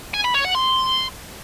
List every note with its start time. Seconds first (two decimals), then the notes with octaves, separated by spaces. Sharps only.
0.14 G#5
0.24 B5
0.34 C#5
0.44 F#5
0.55 C6